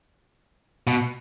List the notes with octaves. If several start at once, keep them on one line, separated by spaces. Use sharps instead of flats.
B2